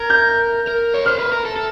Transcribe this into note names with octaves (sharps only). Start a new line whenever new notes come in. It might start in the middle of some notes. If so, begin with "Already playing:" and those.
Already playing: A#4 G#6
G6
A#4
C#5
C5 F6
B4
A#4
A4
A4